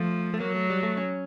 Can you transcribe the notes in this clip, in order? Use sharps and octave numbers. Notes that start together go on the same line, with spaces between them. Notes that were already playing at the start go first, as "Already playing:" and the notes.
Already playing: F3 A3
A3
F#3 A#3
A3
G3
A3
C#4